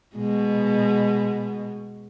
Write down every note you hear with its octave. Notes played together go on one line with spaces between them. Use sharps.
B2 G#3